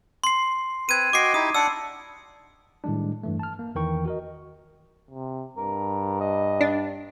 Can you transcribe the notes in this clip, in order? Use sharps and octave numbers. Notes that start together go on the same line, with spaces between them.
C6 C7
C4 B4 G#6 D#7
F#4 D#5 G5 D6 C7
D#4 E4 G4 D#6
D4 D5 F#5 E6
A2 D#3 G3 G#3 D4
G2 E3 A3
A5 F6
A#3
E2 D#3 E3 A#4 G5 C#6
F#4 A#4 D#5
C3
G2 A#4
D#5
D4